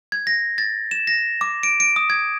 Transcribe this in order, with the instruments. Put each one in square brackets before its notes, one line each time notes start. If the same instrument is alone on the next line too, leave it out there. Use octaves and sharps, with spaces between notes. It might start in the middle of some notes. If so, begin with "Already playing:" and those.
[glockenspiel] G#6
A#6
A6
E7
A#6
D6
D7
D7
D#6
G#6